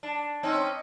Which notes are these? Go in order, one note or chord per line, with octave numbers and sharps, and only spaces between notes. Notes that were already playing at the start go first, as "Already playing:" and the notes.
D4
C4 C#4 D#4